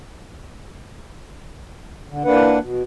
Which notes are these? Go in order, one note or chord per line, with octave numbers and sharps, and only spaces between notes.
D3
E3 A#3 D4 B4 F#5
B2